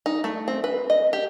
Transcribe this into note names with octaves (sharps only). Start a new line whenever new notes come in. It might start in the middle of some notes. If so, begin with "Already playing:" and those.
D#4
A3
C4
B4
D#5
G4